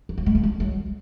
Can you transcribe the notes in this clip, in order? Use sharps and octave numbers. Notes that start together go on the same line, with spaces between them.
F3
F#3
G#3
A#3
G#3
F#3